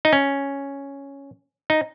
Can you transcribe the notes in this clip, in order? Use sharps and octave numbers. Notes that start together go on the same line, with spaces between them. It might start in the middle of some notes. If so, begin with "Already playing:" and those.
D#4
C#4
D#4